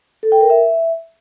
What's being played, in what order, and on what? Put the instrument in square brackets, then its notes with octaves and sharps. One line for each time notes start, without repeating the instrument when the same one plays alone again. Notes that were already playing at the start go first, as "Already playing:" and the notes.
[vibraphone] A4
G5
A#4
E5